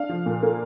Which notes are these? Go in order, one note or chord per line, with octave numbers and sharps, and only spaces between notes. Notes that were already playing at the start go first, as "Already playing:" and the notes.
Already playing: D4 F5
F3
A#2
A#3